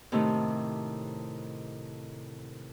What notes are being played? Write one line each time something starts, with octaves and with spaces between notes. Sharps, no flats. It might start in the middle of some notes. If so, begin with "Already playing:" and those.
A2 C3 D#3 A3